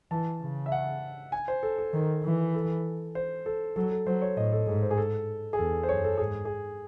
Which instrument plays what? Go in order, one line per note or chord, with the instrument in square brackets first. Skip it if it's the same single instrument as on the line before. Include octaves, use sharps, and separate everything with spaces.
[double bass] E3 [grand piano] A5
[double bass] C#3
[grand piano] E5
F#5
G#5
C5
A4
A4
[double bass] D#3
E3
[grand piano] A4
C5
A4
[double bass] F#3 [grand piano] A4
[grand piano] A4
[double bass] F#3 [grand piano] C5
[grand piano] C#5
[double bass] A2 [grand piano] D#5
[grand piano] A4
[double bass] G#2 [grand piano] G#4
[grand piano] C5
G#4
A4
G#4
[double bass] E2 [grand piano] A4
[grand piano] C5
[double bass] F#2 [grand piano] C#5
[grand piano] A4
[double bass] G#2 [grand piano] G#4
[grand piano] G#4